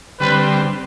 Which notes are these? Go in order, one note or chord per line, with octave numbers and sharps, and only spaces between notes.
D3 G3 C4 B4